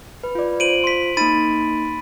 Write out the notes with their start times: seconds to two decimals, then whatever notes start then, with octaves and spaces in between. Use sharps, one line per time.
0.24 B4
0.35 F4 D5
0.60 F4 C5 D7 D#7 F#7
0.84 C6 B6
1.17 A#3 D#4 B5 A6 D#7